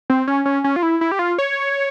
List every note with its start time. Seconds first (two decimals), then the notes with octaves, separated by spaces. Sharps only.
0.10 C4
0.27 C#4
0.45 C#4
0.64 C#4
0.76 F4
0.83 E4
1.01 E4
1.12 G4
1.19 F4
1.38 C#5